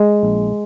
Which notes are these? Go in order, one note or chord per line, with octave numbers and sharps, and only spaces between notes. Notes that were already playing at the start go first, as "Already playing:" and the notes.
Already playing: G#3
A#1